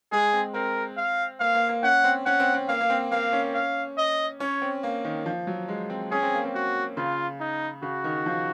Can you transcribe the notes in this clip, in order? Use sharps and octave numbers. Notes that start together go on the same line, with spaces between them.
G#3 G#4
C4
C4 A#4
F5
A#3 F5
A#3
A#3
C#4 F#5
C4
C#4 F#5
C4
C4
A#3 F5
A#3
C4
A#3 F5
C#4
F5
D#5
C#4 C#5
C4
A#3
D#3
F3
F#3
G#3
C4
C#4 G#4
C4
A#3
C4
F#4
C#3 F4
D#4
C#3 F#4
D#3
F3